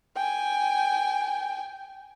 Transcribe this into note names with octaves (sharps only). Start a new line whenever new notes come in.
G5 G#5